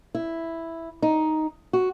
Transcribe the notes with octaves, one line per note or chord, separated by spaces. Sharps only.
E4
D#4
F#4